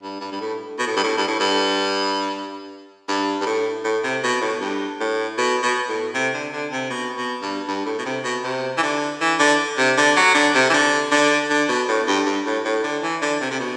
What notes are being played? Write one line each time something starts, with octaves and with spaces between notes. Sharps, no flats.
G2
G2
G2
A2
B2
A2
G2
A2
G2
A2
G2
G2
G2
A2
A2
C3
B2
A2
G2
A2
B2
B2
A2
C3
D3
D3
C3
B2
B2
G2
G2
A2
B2
C3
B2
C3
E3
D3
E3
D3
C3
D3
F#3
D3
C3
E3
D3
D3
D3
B2
A2
G2
G2
A2
A2
D3
E3
D3
C3
C3
B2